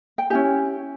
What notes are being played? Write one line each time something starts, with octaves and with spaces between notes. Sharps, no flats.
G5
C#4 E4 G4 G#5